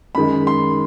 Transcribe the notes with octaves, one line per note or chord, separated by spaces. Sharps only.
F#2 D#3 G#3 B5
C6